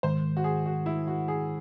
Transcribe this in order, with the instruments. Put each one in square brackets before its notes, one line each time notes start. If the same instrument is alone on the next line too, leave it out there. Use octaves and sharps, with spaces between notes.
[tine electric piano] G#2 D#3 G#3 [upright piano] C5
[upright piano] F#4
G#4
F#4
E4
F#4
G#4